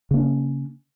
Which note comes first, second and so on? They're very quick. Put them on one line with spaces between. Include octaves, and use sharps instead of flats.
C#3 A#3 D4 C#4